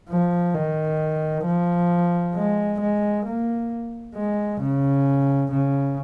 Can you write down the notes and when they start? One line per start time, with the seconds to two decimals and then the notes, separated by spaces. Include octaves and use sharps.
0.09 F3
0.55 D#3
1.45 F3
2.35 G#3
2.81 G#3
3.25 A#3
4.15 G#3
4.61 C#3
5.51 C#3